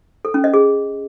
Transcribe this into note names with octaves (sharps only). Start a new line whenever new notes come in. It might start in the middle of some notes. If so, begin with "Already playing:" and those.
A4
C#4
D#5
G#4